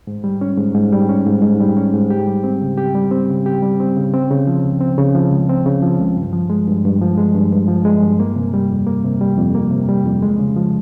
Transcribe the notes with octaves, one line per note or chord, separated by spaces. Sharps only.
G#2
G3
C#4
G#2
G#2
G3
C#4
G#2
G#2
G3
C#4
G#2
G4
G3
C4
C#3
G4
G3
C4
C#3
G4
G3
C4
C#3
C4
C#3
F3
C#2
C4
C#3
F3
C#2
C4
C#3
F3
C#2
G2
F3
G#3
G2
G2
F3
G#3
G2
G2
F3
G#3
G2
A#3
C3
G3
F2
A#3
C3
G3
F2
A#3
C3
G3
F2
G#3
C#3
F3